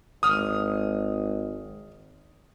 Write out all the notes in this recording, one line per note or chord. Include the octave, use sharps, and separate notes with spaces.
G#1 D#6 F6